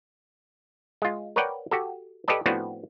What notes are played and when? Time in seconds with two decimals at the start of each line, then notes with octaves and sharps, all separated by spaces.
1.02 G#3 F4
1.36 A#4 B4 C#5 D5 F#5 G5
1.71 F#4 G4 A4
2.28 G4 A4 B4 D5 D#5 A5
2.46 A2 F3 B3 C4 D4 F#4